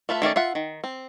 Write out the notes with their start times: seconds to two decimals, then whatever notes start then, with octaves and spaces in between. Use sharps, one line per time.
0.09 A3 F4 B4 E5
0.22 D#3 A3 C#4 D5
0.36 F4 E5 F#5
0.55 D#3
0.84 C4